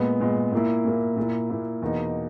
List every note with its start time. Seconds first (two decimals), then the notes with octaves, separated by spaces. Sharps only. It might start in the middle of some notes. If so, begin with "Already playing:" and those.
Already playing: A#2 G#3 B3
0.20 A#2 G#3 B3
0.52 A#2 A#3 E4
0.85 A#2 A#3 E4
1.17 A#2 A#3 E4
1.50 A#2 A#3 E4
1.82 E2 B2 A#3 D#4